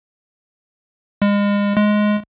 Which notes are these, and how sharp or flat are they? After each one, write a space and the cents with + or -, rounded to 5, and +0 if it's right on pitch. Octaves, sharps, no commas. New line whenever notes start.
G#3 -35
G#3 +10